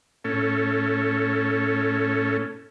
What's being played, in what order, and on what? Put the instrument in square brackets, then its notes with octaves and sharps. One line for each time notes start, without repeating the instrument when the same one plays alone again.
[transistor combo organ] A2 C#4 A4